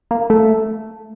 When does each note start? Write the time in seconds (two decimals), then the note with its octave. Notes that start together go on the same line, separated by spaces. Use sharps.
0.11 A#3
0.30 A3